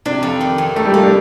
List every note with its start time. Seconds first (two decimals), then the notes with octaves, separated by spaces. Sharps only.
0.05 C3 D4
0.23 F2
0.41 D#3
0.58 F2
0.76 A3 D#4
0.85 G3
0.93 A3 A#3
1.03 D4